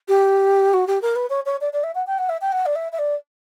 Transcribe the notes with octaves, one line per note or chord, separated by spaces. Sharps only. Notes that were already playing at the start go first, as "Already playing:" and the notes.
G4
F#4
G4
A#4
B4
C#5
C#5
D5
D5
E5
F#5
G5
F#5
E5
G5
F#5
D5
E5
E5
D5